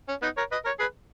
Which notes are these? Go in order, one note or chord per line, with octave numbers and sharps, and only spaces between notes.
C#4
B3 D#4
A#4 C#5
B4 D#5
A#4 C#5
G#4 B4